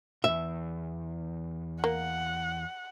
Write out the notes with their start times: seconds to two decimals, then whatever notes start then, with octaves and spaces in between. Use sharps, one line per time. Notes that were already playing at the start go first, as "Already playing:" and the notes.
0.24 E2 G#2 E5
1.84 A#3 F#5